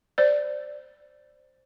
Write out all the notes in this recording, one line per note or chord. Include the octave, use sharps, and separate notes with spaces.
C5 D5